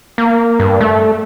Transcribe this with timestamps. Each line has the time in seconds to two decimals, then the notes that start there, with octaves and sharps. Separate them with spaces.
0.18 A#3
0.60 G2
0.81 A3